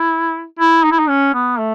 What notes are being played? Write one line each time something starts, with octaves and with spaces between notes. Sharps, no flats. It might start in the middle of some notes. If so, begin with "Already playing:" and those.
Already playing: E4
E4
D#4
E4
D#4
C#4
B3
A3